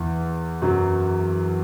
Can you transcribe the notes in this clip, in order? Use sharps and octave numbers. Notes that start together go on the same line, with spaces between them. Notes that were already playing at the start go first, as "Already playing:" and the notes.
Already playing: E2 E3
F#2 F#3